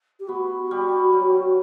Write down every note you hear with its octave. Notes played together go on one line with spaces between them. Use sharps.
G4
B3 F#4
G3
F#3